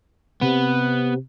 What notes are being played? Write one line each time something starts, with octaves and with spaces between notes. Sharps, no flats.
C3 B3